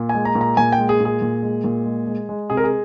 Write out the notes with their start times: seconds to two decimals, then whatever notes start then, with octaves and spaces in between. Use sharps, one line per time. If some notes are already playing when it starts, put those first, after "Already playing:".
Already playing: A#2
0.09 G#5
0.15 G#3
0.25 A#5
0.35 A#2
0.41 A#5
0.57 A#2 G#5
0.72 G5
0.78 G#3
0.89 G#4
1.00 A#2 G#4
1.22 A#2
1.43 G#3
1.64 A#2
1.86 G#3
2.07 G#3
2.29 G#3
2.50 C3 G#4
2.57 A#4
2.64 G#4